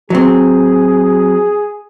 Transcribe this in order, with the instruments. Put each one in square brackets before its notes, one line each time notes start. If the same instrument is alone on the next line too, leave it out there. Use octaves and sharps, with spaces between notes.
[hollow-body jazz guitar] F#3 C4 [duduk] G#4